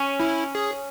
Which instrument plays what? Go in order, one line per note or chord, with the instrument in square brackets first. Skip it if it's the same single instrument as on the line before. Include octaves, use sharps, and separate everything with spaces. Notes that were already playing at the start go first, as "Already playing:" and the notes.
Already playing: [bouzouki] C#4
[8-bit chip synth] E4
G#4